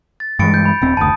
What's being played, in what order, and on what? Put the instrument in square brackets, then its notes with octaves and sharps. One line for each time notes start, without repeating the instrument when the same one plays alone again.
[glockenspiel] A6
[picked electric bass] G2 E3 G#3 [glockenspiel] A6 C#7 D7
[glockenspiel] G6
B5
[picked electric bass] D#1 C4
[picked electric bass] F#1 D2 [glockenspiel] A5 D#6